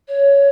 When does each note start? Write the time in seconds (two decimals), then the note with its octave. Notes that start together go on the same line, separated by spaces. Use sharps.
0.08 C#5